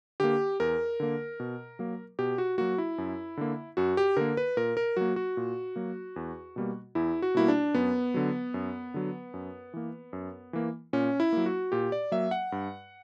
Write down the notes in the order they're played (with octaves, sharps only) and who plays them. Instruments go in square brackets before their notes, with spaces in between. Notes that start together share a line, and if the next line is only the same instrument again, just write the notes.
[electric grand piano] D3 A#3 G4
E2 A#4
D3 A#3
B2
F#3 A#3
B2 G4
F#4
F#3 A#3 F#4
E4
F#2
D3 A#3
F#2 F#4
G4
D3 A#3 A#4
B4
A#2 A#4
A#4
F#3 A#3 F#4
F#4
A#2
F#3 A#3
E2
B2 G3 A#3
E2 E4
F#4
B2 G3 A#3 E4
D4
F#2 B3
D3 F#3
F#2
D3 F#3
F#2
E3 A#3
F#2
E3 A#3
A#2 C#4
E4
F#3 A#3
F#4
A#2 G4
D5
F#3 A#3 E5
F#5
G2